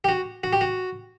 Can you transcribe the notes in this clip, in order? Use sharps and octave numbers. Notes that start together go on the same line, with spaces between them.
G4
F#4
F#4
G4
F#4